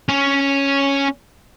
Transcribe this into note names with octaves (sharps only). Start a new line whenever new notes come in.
C#4